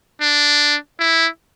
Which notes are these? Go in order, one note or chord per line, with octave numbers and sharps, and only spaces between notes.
D4
E4